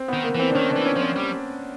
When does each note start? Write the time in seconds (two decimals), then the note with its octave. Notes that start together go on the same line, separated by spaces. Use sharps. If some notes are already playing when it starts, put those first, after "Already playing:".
Already playing: C4
0.08 D#3 B3
0.24 A#3
0.35 E3 C4
0.49 D4
0.55 D#3 C#4
0.70 D4
0.76 E3
0.85 C#4
0.96 F3
1.01 C4
1.16 G3